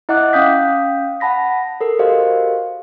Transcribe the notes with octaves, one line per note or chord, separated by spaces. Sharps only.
E4 D#5 F#5 D6 F#6
C#4 F5 G5 D#6 G6 B6
F#5 A5 B5 A#6 B6
A4 A#4
F#4 G4 A#4 C5 D#5 F5